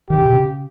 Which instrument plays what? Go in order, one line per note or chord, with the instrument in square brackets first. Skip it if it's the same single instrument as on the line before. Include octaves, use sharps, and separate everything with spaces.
[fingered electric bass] D#3 [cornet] G4
[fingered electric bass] C#3
B2
C#3